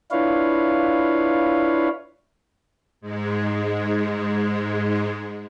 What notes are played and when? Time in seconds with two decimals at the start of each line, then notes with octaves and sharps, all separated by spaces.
0.11 D4 E4 F4 B4 C#5 F5
3.01 G#2 G#3